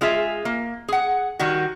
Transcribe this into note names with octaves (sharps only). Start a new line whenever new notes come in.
G#3 F4 G#4 E5
A#3
G#4 F#5
D#3 G3 F#4